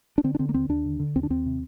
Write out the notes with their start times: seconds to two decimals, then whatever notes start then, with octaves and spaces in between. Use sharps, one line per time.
0.18 D4
0.24 D3 C4
0.35 D4
0.39 D3 C4
0.49 A#3
0.54 D#2 C4
0.69 D#2 D4
0.85 D3
0.99 D3
1.16 D#2 C4
1.23 D4
1.30 D#2 C4
1.46 C3